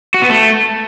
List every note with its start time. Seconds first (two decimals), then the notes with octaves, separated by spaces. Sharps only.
0.14 F#4
0.22 B3
0.30 A3